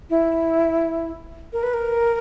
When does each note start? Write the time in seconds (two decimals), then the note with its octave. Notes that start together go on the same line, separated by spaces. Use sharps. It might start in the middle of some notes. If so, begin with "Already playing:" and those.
0.10 E4
1.53 A#4
1.63 B4
1.74 A#4